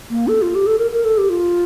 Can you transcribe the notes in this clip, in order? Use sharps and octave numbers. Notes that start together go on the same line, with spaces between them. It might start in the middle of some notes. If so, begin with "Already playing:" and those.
A#3
A4
F4
G4
A4
A#4
A#4
A4
G4
F4